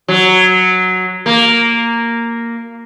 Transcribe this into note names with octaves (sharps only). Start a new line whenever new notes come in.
F#3
A#3